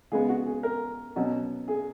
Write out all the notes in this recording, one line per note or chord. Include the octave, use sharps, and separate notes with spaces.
C#3 G#3 B3 G#4
F#4
G#4
A#4
B2 F#3 C#4
G#4